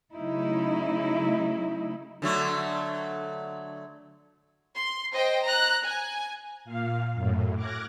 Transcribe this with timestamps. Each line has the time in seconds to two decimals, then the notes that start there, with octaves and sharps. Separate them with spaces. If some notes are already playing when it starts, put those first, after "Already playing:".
0.15 C#3 F#3 A3 D#4 E4
2.22 D3 F#3 A3
4.75 C6
5.14 C5 D#5 G5
5.44 A#5 F#6
5.85 G#5
6.65 A#2 F5
7.14 F#2 A2
7.55 D6 F6 F#6 G#6 A#6